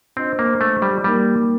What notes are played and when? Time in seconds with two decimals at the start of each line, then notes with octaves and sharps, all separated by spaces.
0.16 C4 D4 F4 C5 D#5
0.39 A#3
0.61 A3
0.82 G3
1.03 G3 A#3 D#4 A#4